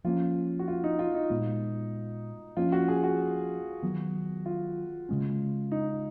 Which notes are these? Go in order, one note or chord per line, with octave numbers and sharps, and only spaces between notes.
F3 A#3 C#4 F4
F#4
F4
D#4
F4
D#4
A#2 G#3 B3
F3 A#3 C#4 F4
F#4
G#4
F#4
D#3 F#3 B3
F4
C#3 G#3 C#4
D#4